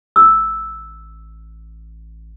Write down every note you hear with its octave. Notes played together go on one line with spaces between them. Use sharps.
A1 E6